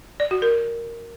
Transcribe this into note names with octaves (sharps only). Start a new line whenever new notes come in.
D5
F#4
A#4